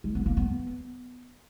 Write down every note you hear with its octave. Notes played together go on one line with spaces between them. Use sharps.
G#3
B3
A#3
B3